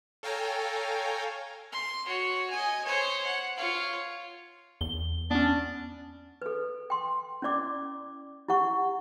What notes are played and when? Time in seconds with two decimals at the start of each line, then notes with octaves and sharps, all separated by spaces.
0.23 A4 C#5 F5 G5 G#5 A#5
1.72 C6
2.06 F#4 C#5
2.51 D#5 G#5
2.85 C5 C#5
3.26 F#5
3.57 F4 C#5
4.81 E2 G7
5.31 B3 C#4 D4
6.42 A4 B4
6.90 G5 C6
7.42 C#4 E4 D5 D6
8.48 E4 G4 F#5 C#6